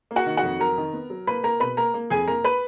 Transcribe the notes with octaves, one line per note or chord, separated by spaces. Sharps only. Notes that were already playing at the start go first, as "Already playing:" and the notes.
A#3
F#4 F#5
D#3
F#4 F#5
F2
F#3 A#4 A#5
D#3
B3
F#3
A#3 B4 B5
A#3 A#4 A#5
B2 B4 B5
A#3 A#4 A#5
A#3
F2 G#4 G#5
A#3 A#4 A#5
B4 B5